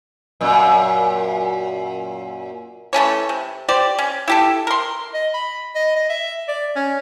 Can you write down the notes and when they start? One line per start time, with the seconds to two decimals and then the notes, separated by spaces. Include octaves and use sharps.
0.41 F#2 A#2
2.93 E3 A3 C#4 C#5
3.29 C3
3.69 G4 C5 D5
3.98 C#4
4.28 E4 G4 A4
4.67 A#4 C6
5.14 D#5
5.34 B5
5.75 D#5
5.96 D#5
6.10 E5
6.48 D5
6.76 C#4